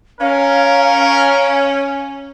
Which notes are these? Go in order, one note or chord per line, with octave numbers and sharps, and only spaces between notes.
C#4 A#4 F5